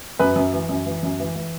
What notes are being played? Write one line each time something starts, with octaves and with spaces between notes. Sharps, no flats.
F#2 B4
F#2
E3
F#2
E3
F#2
E3
E3